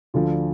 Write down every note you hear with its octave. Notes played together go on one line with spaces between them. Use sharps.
D2 D3 F3 F4 A4